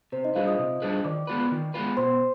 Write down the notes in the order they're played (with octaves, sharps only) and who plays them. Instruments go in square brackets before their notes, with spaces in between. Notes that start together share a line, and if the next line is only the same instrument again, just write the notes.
[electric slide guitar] C3 [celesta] C5
[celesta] D#4 D#5
[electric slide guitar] G3 D4 G#4 B4 [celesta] F4 F5
[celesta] D#5 D#6
[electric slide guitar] C3
G3 D4 G#4 B4
[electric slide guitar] D#3 [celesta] D5 D6
[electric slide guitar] G#3 B3 F4 B4
D#3
G#3 B3 F4 B4
[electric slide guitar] B2 [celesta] C5 C6